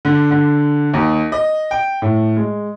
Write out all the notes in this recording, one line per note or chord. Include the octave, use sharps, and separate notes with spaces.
D3
D3
D#2
D#5
G5
A2
G#3